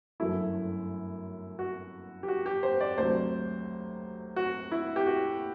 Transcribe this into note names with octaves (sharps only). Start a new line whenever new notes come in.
G1 F#2 F#3 A3 E4
F#4
G4
F#4
G4
C5
D5
D2 C3 F#3 C5
F#4
E4
G4
F#4